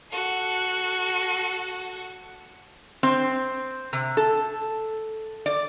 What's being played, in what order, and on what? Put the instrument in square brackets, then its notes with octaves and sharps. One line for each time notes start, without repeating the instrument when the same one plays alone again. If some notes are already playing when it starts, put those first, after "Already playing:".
[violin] F#4 A4
[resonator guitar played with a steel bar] C4
C3
A4
D5